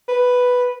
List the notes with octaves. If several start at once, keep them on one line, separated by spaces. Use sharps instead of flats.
B4